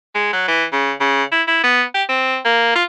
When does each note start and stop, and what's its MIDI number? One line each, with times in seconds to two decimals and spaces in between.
0.15 0.31 56
0.33 0.46 54
0.48 0.64 52
0.72 0.93 49
1.00 1.23 49
1.32 1.42 64
1.47 1.62 64
1.63 1.82 59
1.94 2.03 67
2.09 2.37 60
2.45 2.70 58
2.75 2.83 65